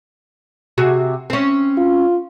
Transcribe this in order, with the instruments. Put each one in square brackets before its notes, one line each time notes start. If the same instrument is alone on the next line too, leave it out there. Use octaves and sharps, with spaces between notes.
[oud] C3 F#4 G#4
C4 C#4
[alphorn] F4